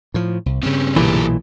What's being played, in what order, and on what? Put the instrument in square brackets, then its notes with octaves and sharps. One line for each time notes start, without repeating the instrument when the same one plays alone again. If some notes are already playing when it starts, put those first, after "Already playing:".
[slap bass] A2 F3
C2
[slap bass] G2 C#3 [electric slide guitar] C4 C#4
[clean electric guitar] B1 A#2 E3 [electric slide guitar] G4 A4 A#4